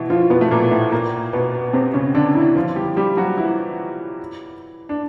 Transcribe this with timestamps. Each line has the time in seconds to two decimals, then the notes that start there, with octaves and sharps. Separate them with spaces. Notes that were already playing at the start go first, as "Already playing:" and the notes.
Already playing: B2 E3 E4
0.10 F3 F4
0.30 B2 B3
0.41 A3
0.51 A#2 A#3
0.71 A2 A3
0.92 A#2 A#3
1.33 B2 B3
1.73 C3 C4
1.94 C#3 C#4
2.15 D3 D4
2.35 E3 E4
2.55 F3 F4
2.76 G3 G4
2.97 G3 G4
3.17 F#3 F#4
3.38 E3 E4
4.89 D4